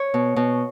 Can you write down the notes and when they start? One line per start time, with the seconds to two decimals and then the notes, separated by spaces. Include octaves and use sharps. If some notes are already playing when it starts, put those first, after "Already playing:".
Already playing: C#5
0.14 B2
0.36 B2